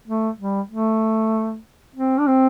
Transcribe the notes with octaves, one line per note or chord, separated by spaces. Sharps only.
A3
G3
A3
C4
D4
C4